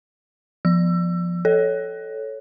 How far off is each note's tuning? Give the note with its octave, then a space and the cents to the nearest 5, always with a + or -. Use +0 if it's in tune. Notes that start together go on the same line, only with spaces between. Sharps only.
F3 +0 E6 +25
A4 -5 C#5 +0